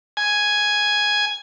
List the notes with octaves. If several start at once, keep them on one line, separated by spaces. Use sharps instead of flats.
G#5